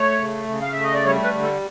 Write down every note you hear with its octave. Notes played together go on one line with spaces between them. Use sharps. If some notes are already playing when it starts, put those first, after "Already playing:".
Already playing: A3 C#5
C#3
C#3
F5
A3 E5
D#5
D5
G3 C#5
B4
D3
A4